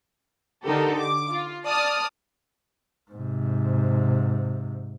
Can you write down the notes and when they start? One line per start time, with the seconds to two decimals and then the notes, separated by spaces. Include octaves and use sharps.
0.66 D3 D#4 G4 A4 A#4
1.00 D6
1.31 F4
1.66 D5 A5 D#6 F6
3.11 G#2 C3